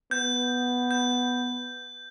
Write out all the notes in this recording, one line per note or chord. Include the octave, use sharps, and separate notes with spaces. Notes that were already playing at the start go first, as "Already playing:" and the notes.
B3 G6
G6